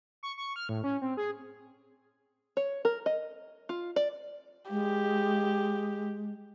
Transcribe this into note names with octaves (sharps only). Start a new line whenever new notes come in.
C#6
C#6
F6
A2
C#4
C4
G#4
C#5
A#4
D#5
F4
D5
G#3 G4